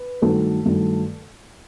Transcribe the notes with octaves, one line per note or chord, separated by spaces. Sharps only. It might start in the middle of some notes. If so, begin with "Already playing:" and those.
Already playing: B4
G2 D#3 F#3 A3 A4
G2 D#3 F#3 A3